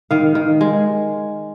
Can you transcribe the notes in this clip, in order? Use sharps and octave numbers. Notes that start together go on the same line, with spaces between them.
D#3 F5
D#3
G#3